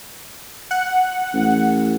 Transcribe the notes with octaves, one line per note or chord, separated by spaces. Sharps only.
F#5
A1